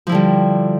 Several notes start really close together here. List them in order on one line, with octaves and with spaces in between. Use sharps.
F3 E4 D3 G3